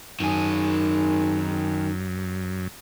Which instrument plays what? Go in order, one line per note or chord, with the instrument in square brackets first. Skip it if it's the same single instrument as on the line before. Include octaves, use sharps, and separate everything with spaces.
[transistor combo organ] F#2 [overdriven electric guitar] D#3 G#4